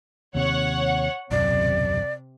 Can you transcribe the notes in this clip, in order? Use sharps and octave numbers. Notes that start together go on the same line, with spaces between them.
D#2 C3 C#5 F#5
D#1 B1 F#2 C3 D5